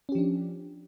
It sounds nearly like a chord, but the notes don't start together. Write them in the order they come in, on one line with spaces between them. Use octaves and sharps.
C#4 G4 F3 D4